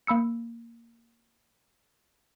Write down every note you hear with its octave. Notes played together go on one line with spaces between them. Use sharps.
A#3 B5 E6 C#7